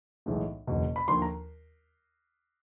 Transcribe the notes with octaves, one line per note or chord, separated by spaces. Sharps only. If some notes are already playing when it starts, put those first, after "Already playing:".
B1 A2 E3 G#3
F#1 E2 B2
B5
D#2 D3 F3 C6
A#5